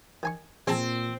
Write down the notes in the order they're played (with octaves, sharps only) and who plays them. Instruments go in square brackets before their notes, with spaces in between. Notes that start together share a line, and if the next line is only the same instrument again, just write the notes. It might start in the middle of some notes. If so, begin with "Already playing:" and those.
[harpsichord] D#3 G#5 C#6
[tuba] A#2 [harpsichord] G#3 A5 [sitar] C4